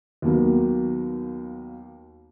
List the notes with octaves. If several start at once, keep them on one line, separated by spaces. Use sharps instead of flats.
D#2 F#3 A#3 B3